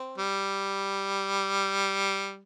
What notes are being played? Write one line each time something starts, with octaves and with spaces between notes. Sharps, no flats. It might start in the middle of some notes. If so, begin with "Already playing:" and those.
Already playing: C4
G3